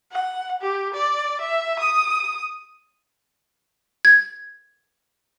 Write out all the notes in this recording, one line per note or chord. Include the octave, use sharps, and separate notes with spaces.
F#5
G4
D5
E5
D#6
G#6